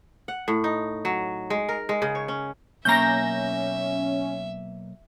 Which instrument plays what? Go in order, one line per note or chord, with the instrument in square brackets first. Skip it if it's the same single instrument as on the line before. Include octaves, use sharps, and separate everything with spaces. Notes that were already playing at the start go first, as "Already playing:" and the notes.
[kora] F#5
A2
D#4
F#3
G#3
A#4
G#3
C#3
C#5
C#4
[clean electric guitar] B1 A#3 A#5 [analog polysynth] C#4 [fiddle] E5 [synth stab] G6 A#6